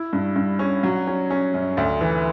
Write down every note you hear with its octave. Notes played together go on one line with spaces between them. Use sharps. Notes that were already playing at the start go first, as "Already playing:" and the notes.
Already playing: E4
G2
G2
C#4
F#3
C#4
C#4
F#2
D2
E3